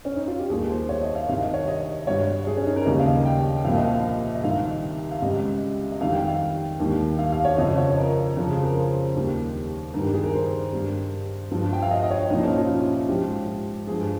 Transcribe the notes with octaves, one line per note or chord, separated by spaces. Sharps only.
C#4
D#4
F4
G4
D#2 D#3 G3 G#4
C5
C#5
D#5
F5
C2 C3 D#3 F5
D#5
C#5
D#5
G2 G3 C#5
G#4
C#4
D#4
A#4
D#2 C#3 G3 D#5
F5
D#5
G5
C2 A#2 F3 F5
D#5
F5
D#5
C2 C3 D#3 G3 F5
F5
C#2 C3 G3 D#5
D#5
F2 D#3 G3 F5
G5
F5
D#2 D#3 G3
F5
F5
C#5
F2 C#3 F3 D#5
C#5
A#4
F2 C#3 F3
G#4
A#4
C5
D#2 D#3 G3
G2 D#3 G3 A#4
G4
G#4
A#4
C5
G2 G3
G2 F3
G5
F5
D#5
D#5
C#5
C2 A#2 F3 D#4
C#4
F4
G#2 F3 G4
G2 F3 G#4